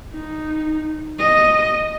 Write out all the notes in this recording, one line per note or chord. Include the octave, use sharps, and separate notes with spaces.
D#4
D#5